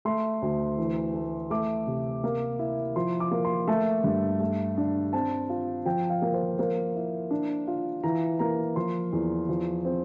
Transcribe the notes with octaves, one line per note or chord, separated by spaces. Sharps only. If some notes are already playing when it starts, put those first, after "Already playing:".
A3 C6
D2
E3
A3
A3 D6
C3
A#3
E4
F3 C6
D6
A#3
C6
A3 A5
G2
A3
D4
C4 A5
F4
F3 G5
F5
A#3
C5
A#3 C5
E4
D4
F4
E3 A#5
A#3 A#5
F3 C6
E2
F3
C4